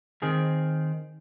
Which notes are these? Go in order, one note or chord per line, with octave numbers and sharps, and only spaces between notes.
D#3 C4 G#4